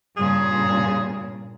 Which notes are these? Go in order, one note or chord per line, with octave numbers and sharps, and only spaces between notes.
G2 A#2 C#3 G#4